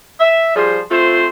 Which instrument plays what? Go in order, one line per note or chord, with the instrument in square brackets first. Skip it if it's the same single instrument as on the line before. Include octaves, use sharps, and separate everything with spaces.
[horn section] E5
F3 G3 G#4 C5
A3 C4 F4 C5